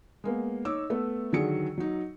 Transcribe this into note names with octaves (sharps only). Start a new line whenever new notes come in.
G#3 A#3 B3
D#4 C#5 D6 E6
A3 B3
D3 D#3 F#3 G#4 C#7
F#3 D#4